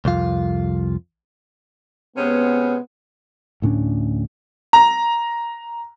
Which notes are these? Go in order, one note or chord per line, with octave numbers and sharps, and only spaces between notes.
C2 F2 F4
C3 G#3 B3 C#4
D2 A2 C#4 D4
A#5